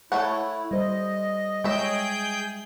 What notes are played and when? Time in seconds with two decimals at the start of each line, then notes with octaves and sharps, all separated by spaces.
0.12 A3 E4 C#5 F#5
0.71 G3 C5 D#5
1.64 G#3 G#4 C#5 E5 G5 G6